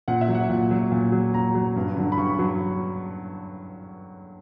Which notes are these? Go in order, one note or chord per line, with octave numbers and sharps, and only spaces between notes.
A#2 F#5
E5
F#3
F#5
A#2
F#3
A#2
F#3
A#2 A#5
F#3
G2
D3 F#3
B5
G2 C#6
F#3